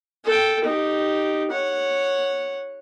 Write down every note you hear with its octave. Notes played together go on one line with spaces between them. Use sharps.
A4 G5
D#4 G4
C#5 F#5